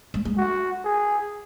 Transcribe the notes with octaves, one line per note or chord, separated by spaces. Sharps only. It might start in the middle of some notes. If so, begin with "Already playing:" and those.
G#3
G#3
F#4
G#4